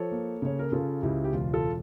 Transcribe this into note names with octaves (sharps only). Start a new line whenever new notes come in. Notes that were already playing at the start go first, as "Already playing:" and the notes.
Already playing: F3 A4 C#5
A#3
C#3 C#5
A#4
C#3 F4 A4
C#2 E4 G4
G4
E1 F4
F4 A4